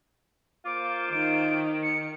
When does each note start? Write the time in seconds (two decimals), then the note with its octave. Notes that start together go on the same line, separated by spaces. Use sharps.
0.65 A#3 F4 C5 D6
1.13 D#3 D7
1.83 C#7